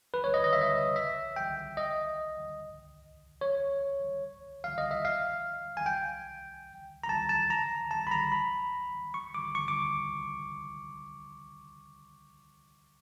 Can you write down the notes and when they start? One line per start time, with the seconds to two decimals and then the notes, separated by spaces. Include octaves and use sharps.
0.14 B4
0.24 C#5
0.34 D#5
0.44 D#5
0.53 E5
0.62 D#5
0.96 E5
1.36 G5
1.77 D#5
3.41 C#5
4.64 F5
4.78 D#5
4.91 E5
5.05 F5
5.77 G#5
5.86 G5
7.04 A#5
7.09 A5
7.29 A5
7.50 A#5
7.91 A5
8.07 B5
8.11 A#5
8.32 B5
9.14 C#6
9.34 D6
9.55 C#6
9.68 D6